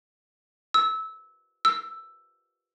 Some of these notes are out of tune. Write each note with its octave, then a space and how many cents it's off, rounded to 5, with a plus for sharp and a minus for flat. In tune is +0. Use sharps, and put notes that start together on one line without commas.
E6 -20
E6 +5